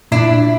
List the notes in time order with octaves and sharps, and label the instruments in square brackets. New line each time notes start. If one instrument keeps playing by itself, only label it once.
[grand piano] A#2 [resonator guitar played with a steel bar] D4 E4